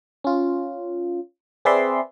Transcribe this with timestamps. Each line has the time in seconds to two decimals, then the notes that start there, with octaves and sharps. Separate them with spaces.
0.24 C#4 F4
1.65 C4 G#4 B4 D5 E5 C6